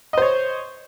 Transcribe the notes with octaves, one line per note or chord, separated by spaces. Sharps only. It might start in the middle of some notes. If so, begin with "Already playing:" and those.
C5 C#5 D#5